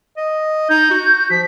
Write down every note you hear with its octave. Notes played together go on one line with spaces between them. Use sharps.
D#5
D#4 G6
F#4
F3 B6